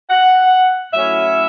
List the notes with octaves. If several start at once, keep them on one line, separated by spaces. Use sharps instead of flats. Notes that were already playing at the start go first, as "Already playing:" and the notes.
F#5
A2 F#3 C#4 E4 E5